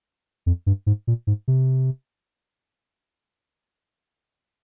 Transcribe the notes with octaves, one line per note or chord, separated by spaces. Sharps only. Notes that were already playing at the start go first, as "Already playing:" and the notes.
F2
G2
G#2
A#2
G#2
C3